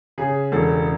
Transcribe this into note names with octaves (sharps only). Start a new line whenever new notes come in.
C#3 G#4
E1 A4